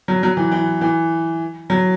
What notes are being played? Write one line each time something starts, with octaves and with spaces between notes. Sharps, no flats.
F#3
F#3
E3
E3
E3
F#3